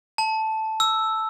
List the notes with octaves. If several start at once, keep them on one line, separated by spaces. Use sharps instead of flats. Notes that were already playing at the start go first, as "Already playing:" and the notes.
A5
E6